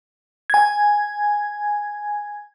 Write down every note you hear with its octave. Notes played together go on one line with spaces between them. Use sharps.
G#5 G#6